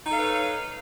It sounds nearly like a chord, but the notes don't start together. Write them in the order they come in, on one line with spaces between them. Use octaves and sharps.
D#4 A4 F5 B4 C#5